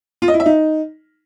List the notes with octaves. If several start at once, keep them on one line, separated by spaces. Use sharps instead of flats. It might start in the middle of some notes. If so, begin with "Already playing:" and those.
F4
D#5
E4
E5
D#4